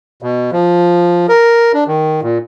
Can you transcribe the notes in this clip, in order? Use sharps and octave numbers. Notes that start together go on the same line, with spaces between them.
B2
F3
A#4
D4
D#3
A#2